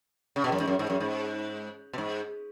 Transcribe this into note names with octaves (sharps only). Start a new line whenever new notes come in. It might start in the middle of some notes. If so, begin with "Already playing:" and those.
C#3
B2
F#2
G#2
F#2
G#2
F#2
G#2
B2
G#2